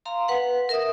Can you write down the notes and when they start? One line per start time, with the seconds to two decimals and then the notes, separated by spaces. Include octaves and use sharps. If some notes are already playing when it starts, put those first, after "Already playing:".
0.05 F5 A#5 C6
0.28 B4 F#5
0.69 A#4 E5 D#6